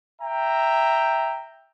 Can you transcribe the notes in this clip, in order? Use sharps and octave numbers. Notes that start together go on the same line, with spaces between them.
E5 G5 A#5